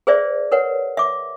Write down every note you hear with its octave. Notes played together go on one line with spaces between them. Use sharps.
G#4 B4 C5 D5 E5
A#4 B4 C#5 F#5
E5 D6